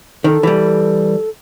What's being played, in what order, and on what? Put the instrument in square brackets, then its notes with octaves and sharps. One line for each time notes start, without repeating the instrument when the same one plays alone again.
[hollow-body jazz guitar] D#3 [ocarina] A4
[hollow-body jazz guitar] E3 G3